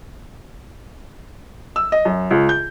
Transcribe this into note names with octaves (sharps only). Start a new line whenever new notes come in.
E6
D#5
F#2
C#2
G6